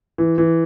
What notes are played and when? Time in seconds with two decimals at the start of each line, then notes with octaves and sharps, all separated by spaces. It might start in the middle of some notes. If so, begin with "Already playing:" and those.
0.18 E3
0.38 E3